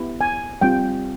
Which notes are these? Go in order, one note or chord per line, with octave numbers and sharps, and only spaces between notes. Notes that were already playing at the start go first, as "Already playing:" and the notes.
Already playing: B3 E4 G4
G#5
G3 C4 F4 G5